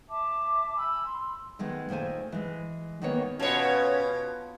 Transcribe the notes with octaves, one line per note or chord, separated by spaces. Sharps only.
E5 A5 D6
G#5 B5 E6
C6
D#3 G#3 A3 B3
A#2 D#3 A3 C5 G#5
E3 G#3
D#3 G#3 A#3 B3 C#5
B2 B3 C#4 F4 C#5 A5